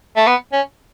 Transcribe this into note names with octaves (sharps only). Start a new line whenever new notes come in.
A3
B3
C#4